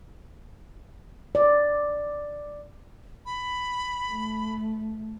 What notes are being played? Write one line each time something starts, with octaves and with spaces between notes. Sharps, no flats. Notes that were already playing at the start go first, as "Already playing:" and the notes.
D5
B5
A3